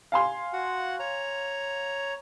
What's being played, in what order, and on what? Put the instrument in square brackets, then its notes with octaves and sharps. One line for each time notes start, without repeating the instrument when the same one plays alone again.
[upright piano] F5 G#5 C6
[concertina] F#4 F#5
C#5 A#5